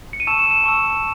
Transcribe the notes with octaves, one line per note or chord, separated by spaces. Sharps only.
C#7
D#7
A5 C#6 E6 E7
E7
E7
A5 C#6 E6